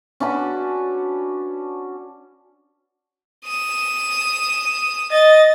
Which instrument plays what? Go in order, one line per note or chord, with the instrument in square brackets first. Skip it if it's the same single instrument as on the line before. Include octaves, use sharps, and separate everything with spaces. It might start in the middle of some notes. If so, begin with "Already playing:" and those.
[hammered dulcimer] C#4 D4 F#4 B4
[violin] D#6 E7
[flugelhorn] D#5 [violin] A6